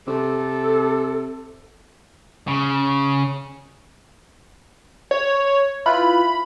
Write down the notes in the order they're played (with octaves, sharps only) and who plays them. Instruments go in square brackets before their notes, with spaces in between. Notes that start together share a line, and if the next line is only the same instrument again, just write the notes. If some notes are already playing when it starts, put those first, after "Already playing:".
[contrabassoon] C3 [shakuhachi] A4
[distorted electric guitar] C#3
[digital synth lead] C#5
[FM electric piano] E4 F4 B4 [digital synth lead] B5